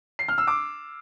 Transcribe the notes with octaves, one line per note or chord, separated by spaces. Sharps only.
C7
F6
E6
D6